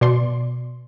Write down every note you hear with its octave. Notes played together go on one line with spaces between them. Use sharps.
B2 D5 C6